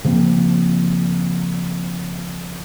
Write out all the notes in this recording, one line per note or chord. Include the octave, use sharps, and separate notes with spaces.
C#3 F3 A#3 C4